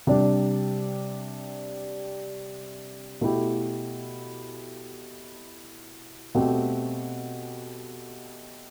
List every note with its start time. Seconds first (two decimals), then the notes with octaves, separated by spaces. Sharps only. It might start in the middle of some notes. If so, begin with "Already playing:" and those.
0.07 C3 G3 D4 G4
3.21 B2 A3 E4 G4
6.35 B2 A3 C4 G4